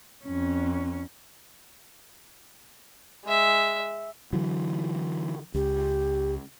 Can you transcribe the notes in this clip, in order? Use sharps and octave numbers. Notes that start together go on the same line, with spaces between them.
F2 C#4
G#3 E5
D3 E3 F#3
C#2 G4